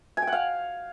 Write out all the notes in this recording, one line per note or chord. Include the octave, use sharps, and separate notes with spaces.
G#5
G5
F#5
F5